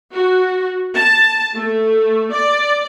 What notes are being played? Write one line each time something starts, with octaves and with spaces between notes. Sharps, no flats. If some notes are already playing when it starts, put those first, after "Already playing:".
F#4
A5
A3
D5